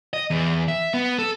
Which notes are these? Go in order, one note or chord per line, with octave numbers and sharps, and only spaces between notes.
D#5
E2
E5
B3
A4